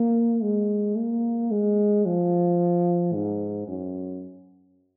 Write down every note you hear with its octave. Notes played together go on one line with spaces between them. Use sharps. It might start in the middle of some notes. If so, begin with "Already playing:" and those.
Already playing: A#3
G#3
A#3
G#3
F3
G#2
F#2